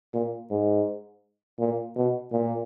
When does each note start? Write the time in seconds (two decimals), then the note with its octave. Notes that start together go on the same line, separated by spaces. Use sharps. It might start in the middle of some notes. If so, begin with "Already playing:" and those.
0.14 A#2
0.50 G#2
1.59 A#2
1.96 B2
2.32 A#2